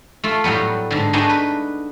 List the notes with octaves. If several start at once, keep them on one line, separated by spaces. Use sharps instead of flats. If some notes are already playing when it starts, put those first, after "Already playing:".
A3 F4
A2 F#3 G3 B3
G#2 D3
A3 B3 D4 D#4 F#4 G#4
B4